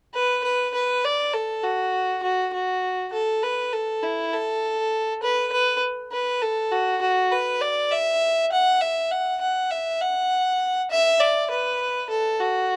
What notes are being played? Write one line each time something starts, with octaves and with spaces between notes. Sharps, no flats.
B4
B4
B4
D5
A4
F#4
F#4
F#4
A4
B4
A4
E4
A4
B4
B4
B4
A4
F#4
F#4
B4
D5
E5
F#5
E5
F#5
F#5
E5
F#5
E5
D5
B4
A4
F#4